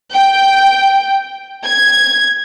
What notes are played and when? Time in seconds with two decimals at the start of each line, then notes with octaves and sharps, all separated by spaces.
0.15 G5
1.64 G#6